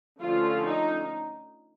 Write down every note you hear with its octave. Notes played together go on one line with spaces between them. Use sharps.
D3 F3 A3 C#4 F4
D#4